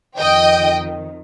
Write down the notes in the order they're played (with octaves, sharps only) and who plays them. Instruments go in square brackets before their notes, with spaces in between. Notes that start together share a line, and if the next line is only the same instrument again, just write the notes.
[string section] F2 D#3 D#5 G5